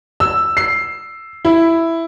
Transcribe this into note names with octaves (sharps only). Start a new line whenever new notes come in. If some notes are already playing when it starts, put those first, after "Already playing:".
E6
C7
E4